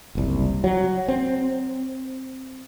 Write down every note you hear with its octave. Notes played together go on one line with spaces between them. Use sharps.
F#1 C2
F#3
C4